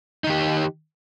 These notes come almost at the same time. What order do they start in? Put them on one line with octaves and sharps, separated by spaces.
D#4 D#3 G4